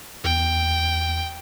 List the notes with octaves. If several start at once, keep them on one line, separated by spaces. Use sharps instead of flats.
E2 G5